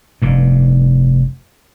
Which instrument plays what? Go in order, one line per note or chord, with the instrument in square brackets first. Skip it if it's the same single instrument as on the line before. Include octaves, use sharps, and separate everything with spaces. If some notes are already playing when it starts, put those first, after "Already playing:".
[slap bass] F1 G2